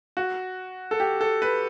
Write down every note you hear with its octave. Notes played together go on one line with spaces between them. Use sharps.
F#4
A4
G4
A4
B4